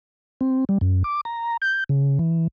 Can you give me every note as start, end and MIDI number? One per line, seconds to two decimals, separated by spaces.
0.41 0.65 60
0.69 0.78 55
0.81 1.03 42
1.04 1.21 86
1.25 1.57 82
1.62 1.84 91
1.89 2.18 49
2.19 2.47 52